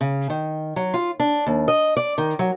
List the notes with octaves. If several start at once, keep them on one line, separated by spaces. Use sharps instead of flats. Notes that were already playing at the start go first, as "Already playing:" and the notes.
C#3
D#3
F#3
F4
D4
D#2
D#5
D5
D#3
F#3